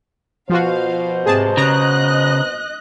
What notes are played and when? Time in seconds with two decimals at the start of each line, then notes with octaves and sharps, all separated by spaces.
0.50 B2 F3 F4 F#4 C5 F5
1.26 G#2 C3 G#4 A5
1.57 C#3 D#5 A#5 F#6